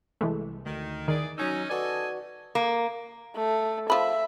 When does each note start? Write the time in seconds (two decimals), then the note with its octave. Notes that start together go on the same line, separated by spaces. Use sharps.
0.21 C2 E3 G#3 A3
0.66 D2 D#3
1.08 D#3 E3 G#4 D5
1.38 F#3 C#4 D#4 G#5 E6
1.70 F#4 A4 B4 D5 D#5 G#5
2.55 A#3
3.36 A3
3.90 F3 E5 B5